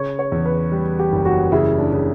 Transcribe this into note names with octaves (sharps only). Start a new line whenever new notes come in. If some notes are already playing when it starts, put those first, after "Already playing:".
Already playing: C#3 C#5
C#5
E2
B4
G3
G4
F#1
F#4
C#3 E4
D4
C#3